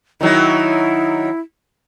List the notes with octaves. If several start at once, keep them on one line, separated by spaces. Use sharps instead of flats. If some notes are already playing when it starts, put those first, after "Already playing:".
D#3 F#3 D#4 E4